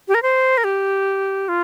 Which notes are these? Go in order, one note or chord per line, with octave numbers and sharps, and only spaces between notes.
G4
A#4
C5
A#4
G4
F4